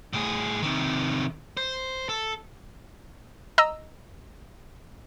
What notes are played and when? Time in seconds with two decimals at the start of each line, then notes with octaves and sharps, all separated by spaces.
0.13 A2 G#4
0.62 C3 D#3
1.57 C5
2.09 A4
3.58 D#5 A#5 E6